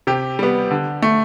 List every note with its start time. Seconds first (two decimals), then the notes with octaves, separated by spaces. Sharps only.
0.07 C3 G4
0.39 G3 B3
0.71 D3
1.03 A3